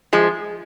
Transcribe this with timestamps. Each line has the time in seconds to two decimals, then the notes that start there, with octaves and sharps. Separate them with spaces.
0.13 F3 G#3